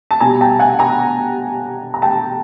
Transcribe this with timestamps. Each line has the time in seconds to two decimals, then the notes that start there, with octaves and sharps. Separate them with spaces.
0.11 A5
0.20 B2 G3 G#5 A#5
0.41 G5 A5
0.59 F#5 G#5
0.79 G#5 A#5
1.94 A#5
2.02 G5 A5